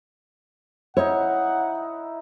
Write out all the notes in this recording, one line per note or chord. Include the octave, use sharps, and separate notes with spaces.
D#4 E4 C#5 F#5